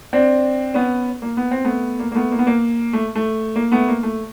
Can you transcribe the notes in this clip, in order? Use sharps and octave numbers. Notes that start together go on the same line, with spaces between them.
C4 D4
B3 C#4
A#3
B3
C4
A3 B3
A#3
A#3
A3 B3
A#3
B3
A#3
A3
A3
A#3
A3 B3
A#3
A3